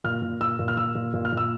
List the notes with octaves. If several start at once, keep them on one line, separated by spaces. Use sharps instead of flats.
A#2 F6
A#2
A#2 E6
A#2
F6
A#2 E6
A#2
A#2
F6
A#2
E6